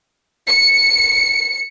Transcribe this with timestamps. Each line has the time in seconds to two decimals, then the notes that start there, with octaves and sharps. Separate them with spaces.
0.48 C#7